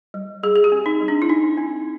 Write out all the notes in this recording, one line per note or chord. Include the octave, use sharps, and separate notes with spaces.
G3
G3 G#4
G#4
G4
C4
D#4
G3
D4
E4
C4 D#4
C4